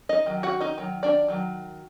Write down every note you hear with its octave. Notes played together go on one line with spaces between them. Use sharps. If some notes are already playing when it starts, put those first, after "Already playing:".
D#4 D#5
D#3 F#3
F#4 F#5
D#4 D#5
D#3 F#3
D4 D5
D#3 F#3